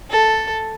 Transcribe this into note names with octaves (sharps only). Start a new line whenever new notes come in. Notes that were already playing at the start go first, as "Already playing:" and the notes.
A4